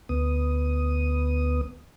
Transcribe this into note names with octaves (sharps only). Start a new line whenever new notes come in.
D2 B3 D#6